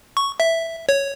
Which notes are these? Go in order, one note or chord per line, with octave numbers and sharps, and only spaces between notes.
C#6
E5
C#5